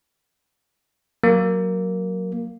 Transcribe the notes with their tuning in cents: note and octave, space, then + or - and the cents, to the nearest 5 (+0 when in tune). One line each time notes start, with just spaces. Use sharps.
F#3 +0 A#3 +0